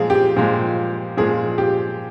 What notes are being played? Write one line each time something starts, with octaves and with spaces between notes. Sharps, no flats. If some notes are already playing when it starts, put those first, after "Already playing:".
Already playing: A#2 F3 G#3 G#4
G4
A#2 F3 G#3
A#2 F3 G#3 G#4
G4